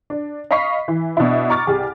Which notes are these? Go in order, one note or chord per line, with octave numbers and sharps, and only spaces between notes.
D4
D#5 F5 B5 C#6 B6 C7
E3
B2 D4 E4
A#5 C#6 D6 F6 A6
C2 G4 G#4